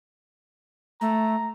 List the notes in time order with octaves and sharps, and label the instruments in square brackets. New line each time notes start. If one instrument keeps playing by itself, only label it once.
[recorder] A3 [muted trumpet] A#5